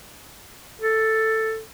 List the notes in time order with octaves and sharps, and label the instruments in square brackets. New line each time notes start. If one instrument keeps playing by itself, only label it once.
[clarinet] A4